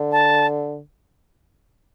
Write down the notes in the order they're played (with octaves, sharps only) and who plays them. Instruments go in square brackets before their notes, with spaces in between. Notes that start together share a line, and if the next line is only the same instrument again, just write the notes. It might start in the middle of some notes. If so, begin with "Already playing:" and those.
Already playing: [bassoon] D3
[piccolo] A5